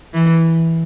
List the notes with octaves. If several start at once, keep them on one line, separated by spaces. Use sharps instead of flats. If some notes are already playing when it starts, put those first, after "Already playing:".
E3